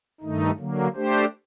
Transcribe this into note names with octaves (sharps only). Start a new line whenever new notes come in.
G2 D#3 A3 D#4
D3 F#3 A#3
A3 D4 G4 C5